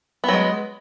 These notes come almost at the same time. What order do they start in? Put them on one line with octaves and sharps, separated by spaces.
B3 F#3 G#3